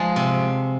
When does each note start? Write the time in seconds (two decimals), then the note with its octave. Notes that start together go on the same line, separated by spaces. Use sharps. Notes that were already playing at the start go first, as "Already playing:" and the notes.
Already playing: F3 G#3
0.16 C3